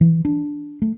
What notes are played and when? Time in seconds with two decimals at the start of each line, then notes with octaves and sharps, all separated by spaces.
0.01 E3
0.25 D4
0.82 A3